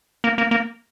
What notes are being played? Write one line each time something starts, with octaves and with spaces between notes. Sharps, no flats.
A#3
A#3
A#3